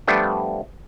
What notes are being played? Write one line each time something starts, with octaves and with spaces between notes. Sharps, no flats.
F3 G3 A3 B3 D4